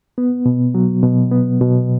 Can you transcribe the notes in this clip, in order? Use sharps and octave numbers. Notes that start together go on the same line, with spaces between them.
B3
B2
F#3
B2
B3
B2